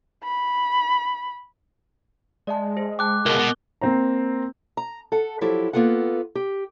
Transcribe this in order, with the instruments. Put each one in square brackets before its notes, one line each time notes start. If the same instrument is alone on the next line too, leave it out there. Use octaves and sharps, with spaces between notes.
[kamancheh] B5
[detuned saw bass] G#3 [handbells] D5 E5 A5
[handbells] G#4 C5
[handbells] G5 A5 [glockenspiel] D6 F#6
[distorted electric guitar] C#2 B2 [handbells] A#4 [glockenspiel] G7
[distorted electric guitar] B2
[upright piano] A#3 C4 C5 A#5
[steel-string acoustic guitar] A#5
A4 F#5
F3 F#3 E4 G4 A4
A#3 B3 F4 A4 F#5
G4